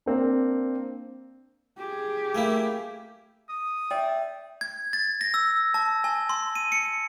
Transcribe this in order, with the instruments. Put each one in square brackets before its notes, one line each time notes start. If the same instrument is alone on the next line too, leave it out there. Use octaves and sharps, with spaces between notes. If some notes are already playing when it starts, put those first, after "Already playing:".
[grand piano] A#3 C4 D4
[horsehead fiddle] G4 G#4
[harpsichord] A3 A#3 E4
[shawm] D#6
[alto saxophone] D5 [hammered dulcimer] E5 [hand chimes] G5
[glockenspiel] G#6
A6
A#6
E6
A5
G#5
C6
D#7
C#7